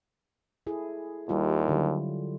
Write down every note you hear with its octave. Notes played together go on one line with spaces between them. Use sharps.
E4 G#4 A4
D#2 G3 E4 F4
D3 F#3